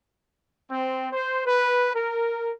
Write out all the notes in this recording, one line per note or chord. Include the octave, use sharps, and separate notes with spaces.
C4
C5
B4
A#4